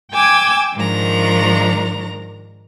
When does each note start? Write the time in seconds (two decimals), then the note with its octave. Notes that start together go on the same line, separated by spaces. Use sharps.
0.12 G5 G#5 D6 E6 G#6
0.74 G#2 D#3 F3 D4 A#4 A#5